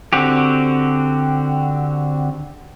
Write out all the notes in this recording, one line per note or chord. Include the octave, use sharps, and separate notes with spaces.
D3 C4 F#4 G4